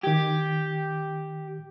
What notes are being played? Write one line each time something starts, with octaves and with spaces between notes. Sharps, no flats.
D#3 G4 G#6